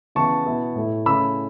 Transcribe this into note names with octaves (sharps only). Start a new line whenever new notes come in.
C#3 E3 B3 E4 A5 C#6
B2 B3 E4
A2 A3 E4
C#3 A3 C#4 E4 B5 E6